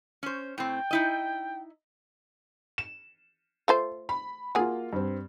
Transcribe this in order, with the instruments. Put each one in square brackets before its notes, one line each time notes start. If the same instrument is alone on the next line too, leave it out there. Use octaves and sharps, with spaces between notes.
[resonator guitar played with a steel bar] C#4 C5
[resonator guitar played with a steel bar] A2 C4 [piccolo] G5
[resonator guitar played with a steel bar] D#4 E4 D#5
[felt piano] E7
[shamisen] A3 F4 C5
[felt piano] B5
[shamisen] F#3 G#4 [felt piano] A#3 F4
[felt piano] G2 C4